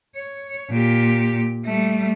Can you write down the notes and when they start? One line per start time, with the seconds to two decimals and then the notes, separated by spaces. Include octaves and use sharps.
0.16 C#5
0.70 A#2 G4
1.65 G3 A3